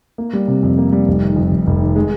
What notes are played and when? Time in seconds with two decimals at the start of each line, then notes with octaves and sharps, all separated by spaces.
0.18 A#3
0.33 G3
0.48 C3
0.63 F2
0.78 A#3
0.92 G3
1.08 F1
1.22 D#3
1.36 F2
1.51 F1
1.67 F1
1.81 D#3
1.96 G#3